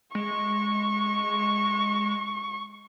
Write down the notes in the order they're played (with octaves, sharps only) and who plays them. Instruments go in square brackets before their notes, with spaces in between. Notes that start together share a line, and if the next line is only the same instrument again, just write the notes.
[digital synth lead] G#3 [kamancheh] C#6